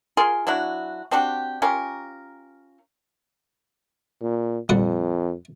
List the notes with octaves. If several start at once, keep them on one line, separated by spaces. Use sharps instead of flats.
F4 G#4 A#4 C6
F#3 D4 E4 F#4
C4 D4 F#4 G4
C#4 F4 G4 A#4
A#2
F2 A#2 G3 F#5